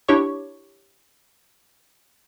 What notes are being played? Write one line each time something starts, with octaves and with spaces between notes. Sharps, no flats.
D4 E4 G4 C#5 C#6